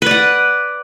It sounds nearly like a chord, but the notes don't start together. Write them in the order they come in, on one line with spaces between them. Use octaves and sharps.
B4 D5 F#5